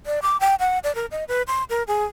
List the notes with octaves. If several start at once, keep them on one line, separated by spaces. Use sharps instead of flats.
D5
D6
G5
F#5
D5
A#4
D#5
B4
C6
A#4
G#4